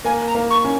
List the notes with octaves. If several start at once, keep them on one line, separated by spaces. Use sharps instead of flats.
A#3 G#5
A#5
A#3
C#6
C#4